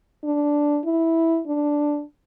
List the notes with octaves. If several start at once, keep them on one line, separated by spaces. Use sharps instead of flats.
D4
E4
D4